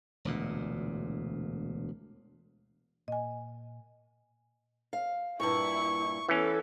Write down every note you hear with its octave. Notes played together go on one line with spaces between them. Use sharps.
E1 D2 A#2
A#2 D#5 G#5
F5
G2 A#2 E4 C#6
E3 B3 C#4 A4